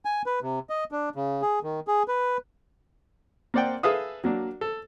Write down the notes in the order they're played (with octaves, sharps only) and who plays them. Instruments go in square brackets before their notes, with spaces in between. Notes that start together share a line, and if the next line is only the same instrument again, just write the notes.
[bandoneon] G#5
B4
C3
D#5
D4
C#3
G#4
D#3
G#4
B4
[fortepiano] A#3 C4 D5 F#5 G5
G#4 A4 B4 E5 F5 D#6
F#3 A#3 D4
A4